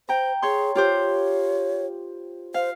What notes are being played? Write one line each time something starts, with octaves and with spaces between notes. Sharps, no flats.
C5 G5 A#5
G#4 C#5 C6
F4 G4 C5 C#5
C5 F5